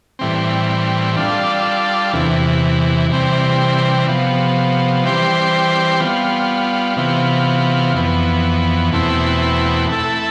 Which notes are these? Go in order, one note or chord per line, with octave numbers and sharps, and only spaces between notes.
A2 E3 G3 C4
G3 D4 F4 A4
E2 C3 E3
C3 E3 G3 C4
C3 F3 B3
E3 G3 C4 G4 C5
G3 B3 F4
C3 E3 B3 F4
F2 E3 B3
E2 B2 A3 C4 E4
A3 E4 A4